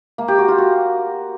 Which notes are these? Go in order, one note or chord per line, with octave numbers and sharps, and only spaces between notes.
A#3
G4
F#4
F4
F#4